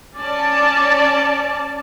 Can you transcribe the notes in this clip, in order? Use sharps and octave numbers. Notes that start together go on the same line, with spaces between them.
C#4 D5 A5